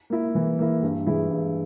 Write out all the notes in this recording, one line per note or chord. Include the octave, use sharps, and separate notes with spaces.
A#3 E4
E3
A#3 E4
G2
E3 G#3 E4
G2